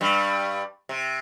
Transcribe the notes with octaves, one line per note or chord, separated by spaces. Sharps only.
G2 G3
C3